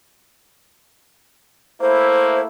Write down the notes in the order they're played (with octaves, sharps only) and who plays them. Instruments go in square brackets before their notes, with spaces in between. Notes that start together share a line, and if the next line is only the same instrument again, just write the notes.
[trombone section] A3 A#3 E4 [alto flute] C5